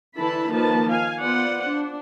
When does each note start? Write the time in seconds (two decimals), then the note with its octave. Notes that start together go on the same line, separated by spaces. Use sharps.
0.16 D3 E3 E4 A5 B5
0.50 D#3 F3 A#3 B4 A5
0.89 F5 G#5
1.21 B3 F4 C5 D5 F#5
1.67 D4